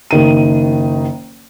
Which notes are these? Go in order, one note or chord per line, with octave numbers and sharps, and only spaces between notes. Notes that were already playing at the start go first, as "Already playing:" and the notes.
F#1 D#3 D#7